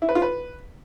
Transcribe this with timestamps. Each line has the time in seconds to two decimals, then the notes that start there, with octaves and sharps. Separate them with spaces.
0.02 E4
0.09 B4
0.15 F4
0.22 B4